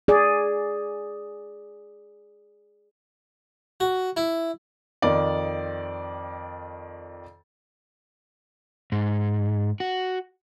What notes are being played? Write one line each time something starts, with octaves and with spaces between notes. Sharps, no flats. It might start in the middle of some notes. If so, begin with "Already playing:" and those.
G#4 D5
F#4
E4
F2 D#3 D5
G#2
F#4